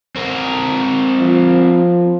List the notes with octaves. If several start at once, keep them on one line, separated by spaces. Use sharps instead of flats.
C4 A#4
F3